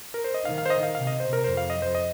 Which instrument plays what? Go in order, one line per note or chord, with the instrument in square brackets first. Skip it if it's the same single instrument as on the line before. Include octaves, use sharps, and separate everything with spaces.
[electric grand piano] A#4
C5
D#5
[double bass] D#3 [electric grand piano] F5
[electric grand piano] F5
C5
D#5
F5
[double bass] C3 [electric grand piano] F5
[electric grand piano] D#5
C5
A#4
[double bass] F2 [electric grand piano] C5
[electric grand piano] F5
D#5
C5
D#5